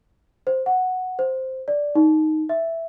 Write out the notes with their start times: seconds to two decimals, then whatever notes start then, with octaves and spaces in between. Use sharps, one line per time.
0.47 C5
0.66 F#5
1.19 C5
1.68 D5
1.95 D#4
2.49 E5